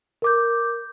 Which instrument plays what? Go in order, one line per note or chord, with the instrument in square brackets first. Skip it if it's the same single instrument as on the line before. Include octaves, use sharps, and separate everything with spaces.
[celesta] A#4 D6 G6